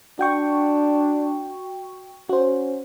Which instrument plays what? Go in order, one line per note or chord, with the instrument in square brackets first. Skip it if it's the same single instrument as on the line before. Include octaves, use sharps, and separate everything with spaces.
[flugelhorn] D4 [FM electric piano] F#4 G5 C#6
[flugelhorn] C#4 [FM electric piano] F#4 C5